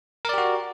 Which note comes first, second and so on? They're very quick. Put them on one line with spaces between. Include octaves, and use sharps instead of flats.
A#4 D5 G4 F#4